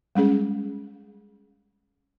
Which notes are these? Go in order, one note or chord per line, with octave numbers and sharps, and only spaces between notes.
G3 G#3 C#4 G#4